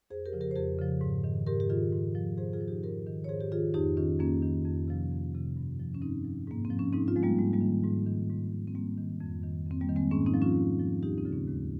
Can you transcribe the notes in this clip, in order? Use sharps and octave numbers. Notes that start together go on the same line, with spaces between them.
F2 G#4 C5
G4 A#4
C#3 F3
G4 A#4
C5
F2 G4 A#4
C#3 F3
G#2
D#3
G#2 G4 A#4
G4
D#3 F4 G#4
G#2
F3
G#2 G#4 C5
F4 G#4
F3
D#4 G4
G#2 G4 A#4
D#3
C#5
G#2 G#4 C5
G4
D#3 F4 G#4
F2 D#4 G4
D#3 C#4 F4
F2 A#3 C#4
D#3
F2
C3 F3
F2
C3 F3
G2
F3
C#4
G2 C4 D#4
F3
G#2 A#3
C4
F3
C#4
G#2 C4 D#4
C#4 F4
F3 G#3
G3 A#3
G#2 G#3
G3 A#3
D#3
G#2 G3
D#3
G#2
D#3
C4
G#2 G3 A#3
D#3
F2
D#3
F2
C4
G3 A#3
D#3
G#3 C4
G#2 A#3 C#4
C4 D#4
F3
C#4 F4
G#2
F3
D#2 D#4 G4
C4 D#4
C#3 F3
A#3 C#4
D#2 G#3